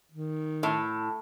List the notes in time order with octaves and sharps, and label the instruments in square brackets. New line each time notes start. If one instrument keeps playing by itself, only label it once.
[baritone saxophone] D#3
[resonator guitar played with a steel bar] A2